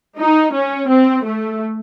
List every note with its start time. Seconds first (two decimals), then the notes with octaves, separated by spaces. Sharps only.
0.18 D#4
0.53 C#4
0.89 C4
1.24 A3